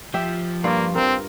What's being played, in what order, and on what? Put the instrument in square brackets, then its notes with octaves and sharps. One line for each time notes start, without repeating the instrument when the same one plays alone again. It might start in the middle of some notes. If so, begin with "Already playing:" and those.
[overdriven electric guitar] F3 [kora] G4 E5
[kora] G2 F4 D5 [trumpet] A#3
[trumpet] C4 [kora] A#4